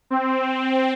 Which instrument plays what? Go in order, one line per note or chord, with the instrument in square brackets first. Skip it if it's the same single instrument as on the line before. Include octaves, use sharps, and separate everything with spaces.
[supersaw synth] C4